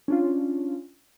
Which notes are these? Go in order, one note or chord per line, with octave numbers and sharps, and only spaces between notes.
C#4 D4 F4